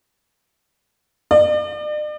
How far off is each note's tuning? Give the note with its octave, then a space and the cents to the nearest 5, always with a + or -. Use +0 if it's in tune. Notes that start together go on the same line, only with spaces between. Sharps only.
D5 +45